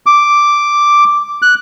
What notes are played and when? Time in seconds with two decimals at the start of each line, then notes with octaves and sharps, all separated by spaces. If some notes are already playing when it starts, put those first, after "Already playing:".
0.06 D6
1.42 F#6